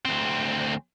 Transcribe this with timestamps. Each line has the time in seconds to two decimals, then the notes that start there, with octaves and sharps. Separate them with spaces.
0.05 D2 C4